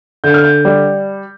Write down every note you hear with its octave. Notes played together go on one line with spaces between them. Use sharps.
D3 G6
F6
G6
G3